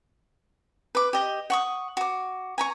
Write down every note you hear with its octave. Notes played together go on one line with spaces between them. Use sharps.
B4 D6
G4 D#5
F#5 C#6 D#6
F#4 D6
G#5 A#5 C#6